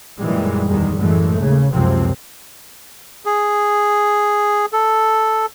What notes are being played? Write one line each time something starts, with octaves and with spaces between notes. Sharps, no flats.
F#2 A#2 D#3 E3 G3 G#3
E2 D#3 G3 G#3
F#2 A2 E3 G#3 A3
D#2 C#3
C#2 F#2 C3 F3 C4
G#4
A4